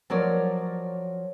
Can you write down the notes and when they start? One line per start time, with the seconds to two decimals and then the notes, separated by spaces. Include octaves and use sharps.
0.10 F3 F#3 A#4 C#5 D5